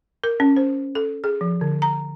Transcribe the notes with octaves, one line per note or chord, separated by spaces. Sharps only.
A#4
C#4
C5
A4
G#4
F3
D3
A#5